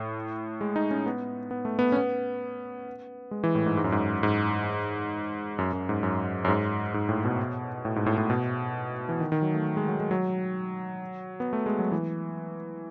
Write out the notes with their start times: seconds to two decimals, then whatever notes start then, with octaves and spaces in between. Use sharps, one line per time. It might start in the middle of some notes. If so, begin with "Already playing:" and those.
Already playing: A2
0.61 G#3
0.76 D#4
0.91 C#4
1.06 B3
1.51 B3
1.65 A3
1.79 B3
1.92 C#4
1.97 B3
3.31 G#3
3.44 E3
3.55 A2
3.66 G#2
3.77 G#2
3.84 F#2
3.92 G#2
4.23 G#2
5.58 F#2
5.73 F#2
5.89 G#2
6.03 F#2
6.45 F#2
6.48 G#2
6.94 G#2
7.09 A2
7.25 B2
7.85 A2
7.96 G#2
8.06 A2
8.18 A2
8.30 B2
9.09 E3
9.20 D#3
9.32 D#3
9.42 F#3
9.54 A3
9.77 G#3
9.88 F#3
10.00 G#3
10.11 F#3
11.40 B3
11.53 A3
11.66 G#3
11.79 F#3
11.92 E3